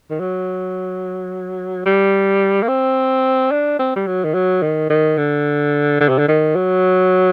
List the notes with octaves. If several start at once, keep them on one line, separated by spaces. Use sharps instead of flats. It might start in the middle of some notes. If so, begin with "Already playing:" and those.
D#3
F#3
G3
A#3
C4
D4
C4
G3
F#3
D#3
F#3
D#3
D#3
D3
D3
C3
D3
D#3
F#3